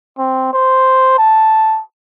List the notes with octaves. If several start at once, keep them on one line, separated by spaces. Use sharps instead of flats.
C4
C5
A5